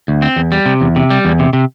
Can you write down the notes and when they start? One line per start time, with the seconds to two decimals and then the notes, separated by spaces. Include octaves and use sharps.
0.08 D2
0.22 C4
0.36 E2
0.52 G3
0.66 C3
0.81 E2
0.96 C3
1.10 G3
1.25 E2
1.39 C3
1.53 C3